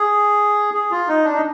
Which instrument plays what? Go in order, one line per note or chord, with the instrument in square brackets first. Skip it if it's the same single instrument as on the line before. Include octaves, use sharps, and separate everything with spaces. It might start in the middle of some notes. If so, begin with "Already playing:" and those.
Already playing: [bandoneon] G#4
G#4
F4
D#4
D4
D#4